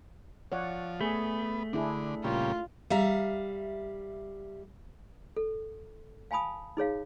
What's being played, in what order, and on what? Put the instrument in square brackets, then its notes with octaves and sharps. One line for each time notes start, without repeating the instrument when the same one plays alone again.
[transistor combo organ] F3 [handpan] C#5 D5 F#5
[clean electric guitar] A3 [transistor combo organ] B3 [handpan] G#4
[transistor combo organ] D3 [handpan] D4 E4 G#4
[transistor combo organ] A#2 C#3 G3 [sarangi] F4
[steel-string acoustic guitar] G3 E5 F5 A#5
[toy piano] A4
F5 G#5 A5 B5 D#6
D#4 G#4 C#5 F5